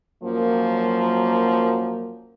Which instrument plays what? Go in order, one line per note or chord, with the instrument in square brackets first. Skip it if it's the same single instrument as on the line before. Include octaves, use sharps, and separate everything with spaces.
[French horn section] F#2 F3 F#3 A#3